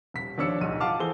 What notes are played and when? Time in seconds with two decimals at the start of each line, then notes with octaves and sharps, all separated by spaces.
0.14 D#1 B6
0.38 D#2 F3 D4 C#5 E6 C#7
0.60 D1 B1 D#7
0.80 F4 F5 F#5 A5 D6 F6
0.99 E3 G#4 A4 C5 G7